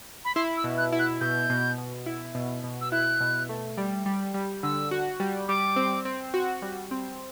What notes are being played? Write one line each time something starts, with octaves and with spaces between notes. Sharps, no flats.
B5
E4 C6
E6
B2
F#6
E4
F#6
B2 G6
B2
B2
E4
B2
B2
E6
E4 F#6
B2
A3
G3
G3
G3
D3 E6
F#4
G3
G3 D6
C4
C4
F#4
G3
C4